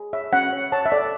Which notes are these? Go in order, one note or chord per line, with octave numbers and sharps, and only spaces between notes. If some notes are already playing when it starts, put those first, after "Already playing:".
Already playing: G#4
C#5 E5
C#4 F#5
C#5
C#5 A5
E5
A4 D5